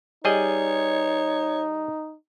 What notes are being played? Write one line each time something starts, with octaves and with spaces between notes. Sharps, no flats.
G3 D#4 G#4 C#5 D#5